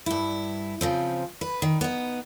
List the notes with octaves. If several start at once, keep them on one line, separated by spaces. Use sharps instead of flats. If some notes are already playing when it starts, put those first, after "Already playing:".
G2 E4
C#3 F3 C4
B4
D#3
B3 D#4